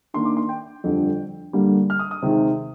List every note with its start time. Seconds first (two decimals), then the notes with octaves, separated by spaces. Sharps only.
0.14 D#3 A#3 D4 C6
0.25 D6
0.37 C6
0.49 G5
0.84 F2 D3 G3 D4
1.53 G2 D3 G3 A#3
1.90 F6
1.99 D#6
2.11 D#6
2.22 C3 D#3 G#3 D#4